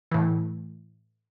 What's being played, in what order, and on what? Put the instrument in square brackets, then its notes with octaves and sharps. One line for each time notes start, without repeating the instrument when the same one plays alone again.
[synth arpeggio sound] A2 E3